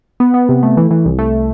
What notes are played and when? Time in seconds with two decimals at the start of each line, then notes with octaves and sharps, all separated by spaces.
0.20 B3
0.34 B3
0.49 C3
0.63 A3
0.77 E3
0.91 E3
1.05 C2
1.19 A3